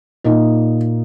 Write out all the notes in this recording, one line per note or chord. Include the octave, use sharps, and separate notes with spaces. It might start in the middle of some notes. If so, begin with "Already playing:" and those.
A#2 A#3 D#4 D#5